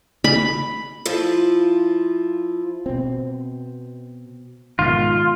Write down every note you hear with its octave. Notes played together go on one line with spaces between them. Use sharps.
B5
F3 E4 F4
B2 C4
G#2 B2 D#3 F4